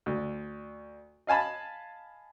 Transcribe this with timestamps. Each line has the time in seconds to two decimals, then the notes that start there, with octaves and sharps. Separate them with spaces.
0.06 D2
1.27 D#5 F5 G#5 A5 B5